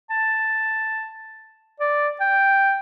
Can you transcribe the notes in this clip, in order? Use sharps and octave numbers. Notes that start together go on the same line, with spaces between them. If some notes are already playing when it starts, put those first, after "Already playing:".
A5
D5
G5